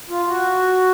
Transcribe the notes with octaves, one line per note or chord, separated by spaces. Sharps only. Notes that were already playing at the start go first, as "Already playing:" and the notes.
F4
F#4